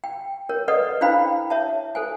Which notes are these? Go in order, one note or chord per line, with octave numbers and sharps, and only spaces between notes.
G5
A#4 C#5
A4 B4 D5 D#5 F#5 D#6
D4 E4 C5 F5 G5 B5
C#5 E5 A5
A4 C5 G#5